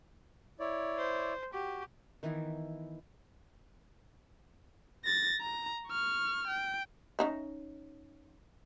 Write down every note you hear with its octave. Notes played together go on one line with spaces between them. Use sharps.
E4 C#5 D5
C5
F#4 G4
D#3 E3 B3 E4
A6 A#6
A#5
C#6 F6
G5
C#4 D#4 E5